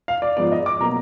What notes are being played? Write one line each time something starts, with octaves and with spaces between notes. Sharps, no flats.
F5
D5
G#2 F3 G#3 B3 D5
D#5
D6
B2 F#3 A#3 A#5